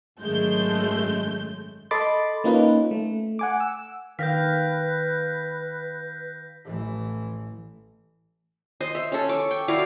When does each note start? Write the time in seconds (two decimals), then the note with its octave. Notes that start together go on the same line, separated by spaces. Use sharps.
0.19 G#1 F#2 G#3 A3 G6
1.91 A4 D#5 B5 C6 D6 A6
2.44 A#3 C#4 D#4 F4 B4
2.91 A3
3.39 F#5 G#5 D6
3.60 E6
4.19 D#3 B4 F5 G5 G6 A#6 B6
6.65 A1 E3
8.81 C5 D#5
8.95 E5
9.12 C#4 A4
9.29 C#6 D6
9.51 G5
9.68 E4 F#4 D5 F5